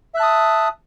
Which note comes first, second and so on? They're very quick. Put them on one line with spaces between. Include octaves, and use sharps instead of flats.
E5 F#6 A5 D#6